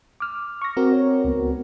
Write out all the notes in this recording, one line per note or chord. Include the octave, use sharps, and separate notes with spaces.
D6 F6
C#6 A#6
C4 F#4 A#4
C#5
C#2 B3